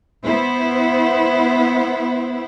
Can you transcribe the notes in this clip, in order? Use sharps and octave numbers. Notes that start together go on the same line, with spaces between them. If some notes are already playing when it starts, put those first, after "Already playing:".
B3 E4 C5